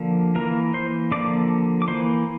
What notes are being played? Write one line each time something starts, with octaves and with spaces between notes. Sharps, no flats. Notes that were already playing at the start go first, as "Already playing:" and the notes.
Already playing: D3 F3 A#3
E3 A#3 A#4 A#5
C5 C6
D3 F3 A#3 D5 D6
D6
E3 A#3 C5 C6